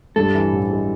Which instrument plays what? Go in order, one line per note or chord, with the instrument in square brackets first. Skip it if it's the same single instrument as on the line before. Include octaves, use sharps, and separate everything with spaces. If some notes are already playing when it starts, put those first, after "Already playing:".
[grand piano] G2 [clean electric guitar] A4
[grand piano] E3
A1
G#3